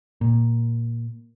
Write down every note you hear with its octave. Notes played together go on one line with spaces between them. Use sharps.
A#2